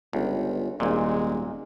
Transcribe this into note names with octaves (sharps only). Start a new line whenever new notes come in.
G1 C#2
D#1 G#1 A#2 G#3